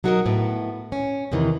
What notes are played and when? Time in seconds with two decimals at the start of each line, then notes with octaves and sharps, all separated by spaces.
0.04 F#3 D#4 F#4 A4 A#4 D#5
0.26 A2 B3
0.92 C#4
1.32 E2 C3 D#3 E3